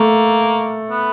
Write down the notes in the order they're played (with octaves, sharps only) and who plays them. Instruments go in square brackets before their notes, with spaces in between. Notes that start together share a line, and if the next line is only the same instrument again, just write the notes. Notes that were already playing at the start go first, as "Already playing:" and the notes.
Already playing: [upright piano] A3 [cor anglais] A#3
[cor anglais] B3